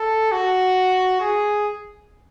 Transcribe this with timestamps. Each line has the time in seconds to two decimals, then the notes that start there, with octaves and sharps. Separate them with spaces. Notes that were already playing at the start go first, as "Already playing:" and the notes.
Already playing: A4
0.32 F#4
1.21 G#4